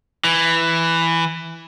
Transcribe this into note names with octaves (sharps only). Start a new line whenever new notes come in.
E3